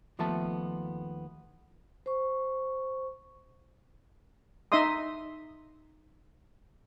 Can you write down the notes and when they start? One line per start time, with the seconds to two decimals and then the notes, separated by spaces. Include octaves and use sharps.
0.19 D#2 F3 A3 B3 E5 A5
2.06 C5 C#6
4.72 D#4 D#5 E5 C6 D#6